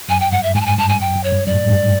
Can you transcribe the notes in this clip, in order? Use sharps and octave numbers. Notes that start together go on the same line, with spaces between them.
F#2 G#5
G5
G2 F#5
E5
G#2 G#5
A5
G#5
G2 A5
G#5
F#2 G5
F#2
C#5
G2
F#2 D5
A2
G#2
G2